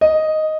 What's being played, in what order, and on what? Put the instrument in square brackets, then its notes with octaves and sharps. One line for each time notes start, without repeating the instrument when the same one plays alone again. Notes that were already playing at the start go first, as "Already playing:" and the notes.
[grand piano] D#5